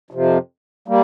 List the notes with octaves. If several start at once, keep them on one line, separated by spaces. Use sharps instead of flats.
F2 C3 F3
G3 A#3